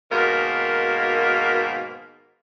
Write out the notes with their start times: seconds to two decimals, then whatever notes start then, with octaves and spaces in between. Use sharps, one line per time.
0.12 G#2 B2 D#3 A#3